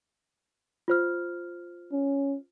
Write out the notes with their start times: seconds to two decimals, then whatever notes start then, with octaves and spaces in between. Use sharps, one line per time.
0.88 F4 C5 F6
1.92 C#4